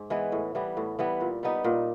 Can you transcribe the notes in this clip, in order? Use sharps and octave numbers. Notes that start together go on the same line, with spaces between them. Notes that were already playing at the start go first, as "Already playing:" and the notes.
Already playing: G#2
E3 G#3 B3
A2
E3 G3 B3
A2
E3 G3 B3
A#2
G3 B3 D#4
A#2